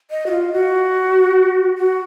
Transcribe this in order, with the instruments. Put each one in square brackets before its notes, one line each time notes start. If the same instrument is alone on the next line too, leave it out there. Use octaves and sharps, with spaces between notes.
[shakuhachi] D#5
F#4
F4
F#4
F#4